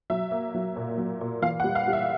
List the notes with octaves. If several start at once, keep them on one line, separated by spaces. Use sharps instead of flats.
F#3 E5
A#3
F#3
A#2
F#3
A#2
E3 F5
F#5
G3
F5
G3
E5